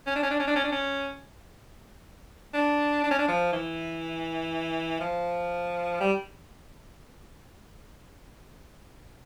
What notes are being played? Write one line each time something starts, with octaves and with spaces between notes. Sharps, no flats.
C#4
D4
C#4
D4
C#4
D4
C#4
D4
C#4
D4
D4
C#4
D4
F3
E3
F3
G3